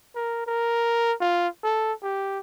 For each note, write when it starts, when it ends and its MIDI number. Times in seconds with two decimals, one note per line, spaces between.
0.15 0.44 70
0.47 1.14 70
1.20 1.48 65
1.63 1.93 69
2.03 2.40 67